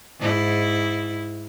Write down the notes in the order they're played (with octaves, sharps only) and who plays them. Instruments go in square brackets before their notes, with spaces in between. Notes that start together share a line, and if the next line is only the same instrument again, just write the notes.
[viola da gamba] G#2 E4